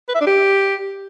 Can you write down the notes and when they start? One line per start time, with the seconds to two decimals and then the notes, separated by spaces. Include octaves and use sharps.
0.09 B4
0.15 E5
0.21 D4
0.26 G4